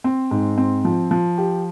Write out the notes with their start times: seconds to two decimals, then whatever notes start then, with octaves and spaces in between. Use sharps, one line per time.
0.04 C4
0.31 G#2
0.58 C4
0.85 F3
1.11 F3
1.38 G4